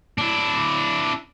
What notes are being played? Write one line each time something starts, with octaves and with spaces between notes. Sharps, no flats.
D4 E4